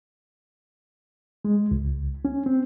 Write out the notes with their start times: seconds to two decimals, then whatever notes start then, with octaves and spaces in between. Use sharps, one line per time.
1.45 G#3
1.71 C#2
2.25 C#4
2.46 C4